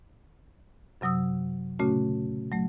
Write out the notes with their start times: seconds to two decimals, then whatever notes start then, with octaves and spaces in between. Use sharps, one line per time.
1.01 F#2 C3 F#3 D#6 E6
1.79 A#2 C#3 A3 C#4 F#4
2.52 F#3 A3